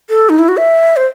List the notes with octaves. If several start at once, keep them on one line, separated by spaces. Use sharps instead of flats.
A4
D#4
E4
F#4
E5
C5